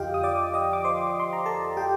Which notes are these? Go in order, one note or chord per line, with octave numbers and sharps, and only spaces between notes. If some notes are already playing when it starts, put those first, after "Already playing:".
Already playing: F2 D3 F3 F4 G4 D#5 F5 G5
D#6
D5 D6
D#5 D#6
D6
C5 C6
D6
C6
A#5
A4 A5
G4 G5